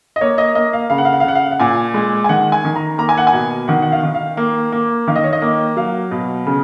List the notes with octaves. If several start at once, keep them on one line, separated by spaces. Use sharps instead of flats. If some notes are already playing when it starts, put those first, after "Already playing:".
D#5
A#3 C#5
D#5
A#3 D#5
F5
C#3 F5
F#5
F5
F#5
F5
C#3 F#5
F5
F#5
A#2 G#5
G#3
G#5
D#3 F#5
G#5
D#3
A#5
A#3 A#5
G#5
F#5
G#5
B2
D#3 F#5
F#5
F5
D#3
F5
A#3
A#3
D#3 F5
D#5
C#5
D#5
A#3
F#3 F5
B2
C#3